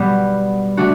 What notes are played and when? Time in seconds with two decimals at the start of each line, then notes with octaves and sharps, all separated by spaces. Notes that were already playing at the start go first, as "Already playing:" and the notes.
Already playing: B2 G3 B3
0.77 A3 D4 F#4